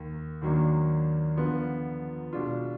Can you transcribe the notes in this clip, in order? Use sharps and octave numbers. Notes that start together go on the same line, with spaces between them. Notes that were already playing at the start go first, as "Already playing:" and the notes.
Already playing: D#2 D#3 A#3
D#2 D#3 F#3 A#3 D4
D3 F3 B3 F4
B2 G#3 D4 F4